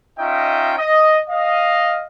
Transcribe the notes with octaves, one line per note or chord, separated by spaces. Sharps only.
C#4 D#4 F4 D#5 E5 G5
D#5
D#5 F5